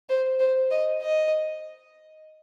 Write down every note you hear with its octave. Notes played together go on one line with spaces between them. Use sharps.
C5
C5
D#5
D#5